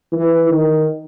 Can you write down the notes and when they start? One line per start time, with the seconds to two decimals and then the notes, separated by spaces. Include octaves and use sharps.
0.12 E3
0.50 D#3